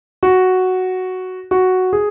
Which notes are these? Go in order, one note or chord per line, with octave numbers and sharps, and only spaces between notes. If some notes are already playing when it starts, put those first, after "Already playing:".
F#4
F#4
G#4